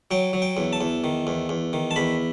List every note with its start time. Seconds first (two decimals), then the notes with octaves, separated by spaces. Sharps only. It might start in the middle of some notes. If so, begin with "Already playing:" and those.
0.11 F#3 G5
0.33 F#3
0.42 G5
0.57 E2
0.73 A5
0.81 E2
1.04 D#3
1.27 E2
1.49 E2
1.73 D#3
1.91 A5
1.96 E2 B5